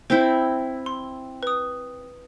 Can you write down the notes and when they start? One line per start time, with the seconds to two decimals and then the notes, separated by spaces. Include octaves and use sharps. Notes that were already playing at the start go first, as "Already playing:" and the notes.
0.10 C4 E4 C5 G6
0.86 C6
1.43 B4 D#6